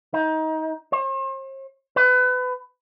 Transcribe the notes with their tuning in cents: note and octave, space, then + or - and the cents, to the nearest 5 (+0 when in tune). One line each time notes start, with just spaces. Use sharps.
D#4 +25
C5 +45
B4 +30